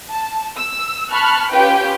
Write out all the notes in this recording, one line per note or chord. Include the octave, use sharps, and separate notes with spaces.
A5
E6
A5 B5 C#6 F6 F#6
C#4 F4 G4 B4 G5